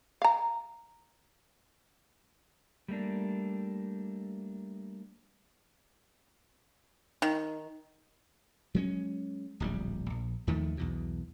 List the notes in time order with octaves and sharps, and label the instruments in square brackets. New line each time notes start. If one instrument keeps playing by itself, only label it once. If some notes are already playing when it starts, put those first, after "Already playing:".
[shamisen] F5 A#5
[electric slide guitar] G3 A3 A#3 D4
[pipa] D#3
[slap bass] F#3 G#3 C#4
D1 A#1 G3
A#1
D#2 D#3 F3 A3
B1 E2 B2